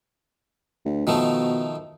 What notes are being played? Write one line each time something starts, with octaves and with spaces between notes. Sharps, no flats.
D2
B2 D#3 F3 A3